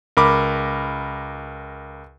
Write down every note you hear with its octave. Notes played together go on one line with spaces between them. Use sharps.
C#2 A#4 B5 D6